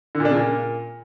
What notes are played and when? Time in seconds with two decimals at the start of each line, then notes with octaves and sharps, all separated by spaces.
0.15 D3
0.20 A#2
0.25 D4
0.30 C#3
0.35 A#2